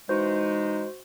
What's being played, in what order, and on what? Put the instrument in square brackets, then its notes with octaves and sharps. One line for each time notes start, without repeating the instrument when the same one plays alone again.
[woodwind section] E3 G#3 D#4 [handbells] F#4 C5